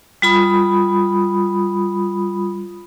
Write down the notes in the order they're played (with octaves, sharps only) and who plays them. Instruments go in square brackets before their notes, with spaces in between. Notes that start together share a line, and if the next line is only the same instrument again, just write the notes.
[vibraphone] G3 F4 B5 D#6